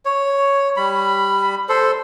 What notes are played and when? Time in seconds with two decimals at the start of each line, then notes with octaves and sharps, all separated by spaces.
0.05 C#5
0.77 G3 B5
1.69 A4 C5